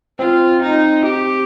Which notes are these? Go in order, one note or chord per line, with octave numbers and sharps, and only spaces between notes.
C4 F4
D#4
G4